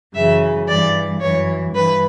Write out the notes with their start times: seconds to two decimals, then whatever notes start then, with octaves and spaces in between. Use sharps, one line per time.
0.14 F#2 C#3 E3 E5
0.67 G2 E3 D5
1.20 F#2 E3 C#5
1.74 G2 E3 B4